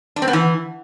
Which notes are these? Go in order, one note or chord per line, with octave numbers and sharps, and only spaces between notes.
D4
C4
B3
E3